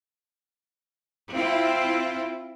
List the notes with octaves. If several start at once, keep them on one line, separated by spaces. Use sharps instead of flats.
C4 E4 F4